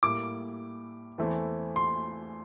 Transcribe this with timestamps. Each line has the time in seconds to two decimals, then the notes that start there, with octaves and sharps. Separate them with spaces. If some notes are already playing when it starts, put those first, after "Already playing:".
0.03 A2 G3 A#3 E4 D6
1.18 E2 E3 A3 C4
1.76 C6